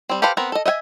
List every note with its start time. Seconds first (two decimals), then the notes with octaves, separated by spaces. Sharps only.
0.09 G3 C4
0.22 G4 A4 B4 C5 F5
0.37 B3 C4 A#4
0.52 A4 D#5
0.66 D#5 E5 F#5 G#5